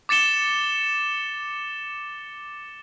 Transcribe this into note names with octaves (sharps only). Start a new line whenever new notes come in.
D6 A6 C#7 E7 G7